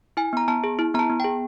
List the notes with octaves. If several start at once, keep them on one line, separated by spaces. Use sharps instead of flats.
E4 G#5
B3 A#5
B3 A5
G#4
E4
B3 A#5
A5
B3
G#4 G5